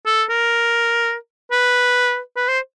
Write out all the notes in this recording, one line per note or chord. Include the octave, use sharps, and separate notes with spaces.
A4
A#4
B4
B4
C5